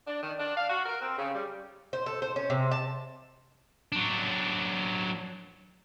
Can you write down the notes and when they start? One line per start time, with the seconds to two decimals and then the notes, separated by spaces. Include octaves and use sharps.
0.07 D4
0.22 D#3
0.38 D4
0.56 F5
0.69 F#4
0.86 A#4
1.01 C4
1.17 C#3
1.34 G3
1.93 C5
2.06 A4
2.22 C5
2.36 C#4
2.50 C3
2.71 A5
3.92 F#3 D4